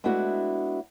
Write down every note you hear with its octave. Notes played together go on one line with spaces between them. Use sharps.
G#3 A3 B3 D4 E4 F#4